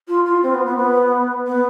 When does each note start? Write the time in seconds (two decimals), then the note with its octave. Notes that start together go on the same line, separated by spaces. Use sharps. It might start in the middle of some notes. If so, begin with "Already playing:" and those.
0.08 F4
0.26 F4
0.43 C4
0.54 B3
0.66 B3
0.77 B3
1.46 B3